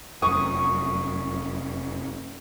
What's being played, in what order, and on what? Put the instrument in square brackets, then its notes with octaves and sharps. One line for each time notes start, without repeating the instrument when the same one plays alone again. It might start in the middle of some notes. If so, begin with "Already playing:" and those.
[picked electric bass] F1 F#2 [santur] C#6 D#6